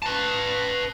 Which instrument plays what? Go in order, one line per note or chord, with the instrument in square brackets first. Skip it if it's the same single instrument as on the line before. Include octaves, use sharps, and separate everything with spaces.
[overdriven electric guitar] B4 A5